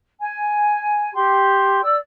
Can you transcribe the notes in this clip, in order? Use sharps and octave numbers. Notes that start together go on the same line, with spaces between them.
G#5
G4 C6
D5 E6